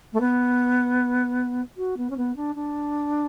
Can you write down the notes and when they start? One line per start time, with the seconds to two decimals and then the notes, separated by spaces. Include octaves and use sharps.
0.13 A3
0.20 B3
1.77 F#4
1.97 B3
2.10 C#4
2.17 B3
2.36 D4
2.55 D4